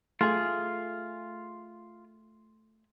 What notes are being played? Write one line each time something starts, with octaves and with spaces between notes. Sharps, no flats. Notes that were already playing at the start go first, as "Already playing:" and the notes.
A3 F4 G#4